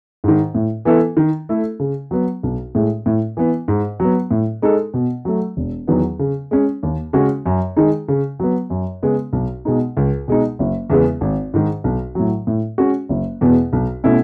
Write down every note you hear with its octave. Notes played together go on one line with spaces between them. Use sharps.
G#2 D#3
A2
E3 B3 E4 A4
D#3
A3 E4 A4
C#3
F#3 B3
B1
A2 G#3
A2
E3 B3
G#2
F#3 B3
A2
G#3 D#4 A4
B2
F#3 A3
E1
E2 D#3 F#3 B3
C#3
G#3 C#4
D#2
C#3 G#3 C#4 F#4
F#2
D#3 G#3 D#4 G#4
C#3
F#3 B3
F#2
C#3 G#3 B3
B1
B2 G#3 D#4
C#2
B2 G#3 D#4
F#1
E2 C#3 G#3 B3
G#1
G#2 D#3 G#3
B1
A2 F#3
A2
G#3 C#4 F#4
F#1
E2 B2 G#3 B3
B1
B2 A3 C#4 E4